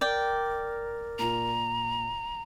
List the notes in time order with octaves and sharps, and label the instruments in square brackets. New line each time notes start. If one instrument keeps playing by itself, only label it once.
[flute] A#4 [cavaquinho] D5 G5
[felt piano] A#2 F4 [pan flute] A#5